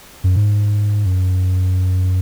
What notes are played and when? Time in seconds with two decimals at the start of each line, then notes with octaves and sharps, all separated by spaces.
0.24 F#2
0.36 G#2
1.06 F#2